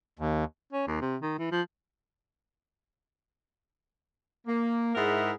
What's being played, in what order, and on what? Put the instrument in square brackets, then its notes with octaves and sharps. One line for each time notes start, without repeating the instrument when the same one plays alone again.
[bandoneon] D#2
[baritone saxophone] C#4
D#2
C3
D#3
E3
F3
[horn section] A#3
G#2 E4 G#4 A#4 E5 F#5